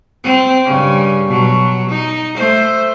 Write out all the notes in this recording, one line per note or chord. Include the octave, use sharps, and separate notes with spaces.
C4
G2 C#3
B2 F#3
D#4
A3 C5